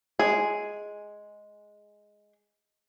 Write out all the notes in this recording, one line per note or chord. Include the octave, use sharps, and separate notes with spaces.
G#3 G#4